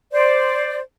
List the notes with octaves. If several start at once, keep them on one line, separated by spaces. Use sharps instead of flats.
C5 D5